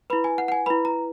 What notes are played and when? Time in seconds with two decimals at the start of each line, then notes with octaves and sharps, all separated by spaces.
0.10 E4 B4 B5
0.24 G#5
0.38 F#5
0.48 F#5
0.52 G#5
0.66 E4 B4 B5
0.85 A#5